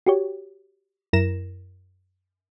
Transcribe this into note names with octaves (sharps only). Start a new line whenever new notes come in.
F#4 G4 C#5
F#2 E4 A#4 A#6 E7